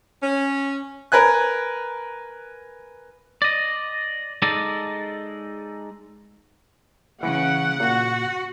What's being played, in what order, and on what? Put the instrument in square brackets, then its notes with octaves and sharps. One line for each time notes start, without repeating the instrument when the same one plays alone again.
[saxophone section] C#4
[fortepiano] A#4 B4 G#5 F#6
[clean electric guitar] D5 D#5
G#3 D#4 A4 D5 D#5
[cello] C#3 C#4 [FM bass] E3 [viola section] F#5
[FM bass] A#2 [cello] F#4